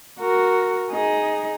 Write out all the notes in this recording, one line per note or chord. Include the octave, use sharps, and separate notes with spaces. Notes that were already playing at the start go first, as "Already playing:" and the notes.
F#4 A#4
D#4 G#4